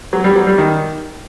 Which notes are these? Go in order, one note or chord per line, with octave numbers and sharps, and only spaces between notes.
F#3
G3
F#3
G3
D#3